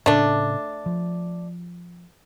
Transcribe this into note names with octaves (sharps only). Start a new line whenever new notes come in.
A2 C#3 A3 D4
F3